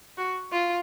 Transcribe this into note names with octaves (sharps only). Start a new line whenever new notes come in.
F#4
F4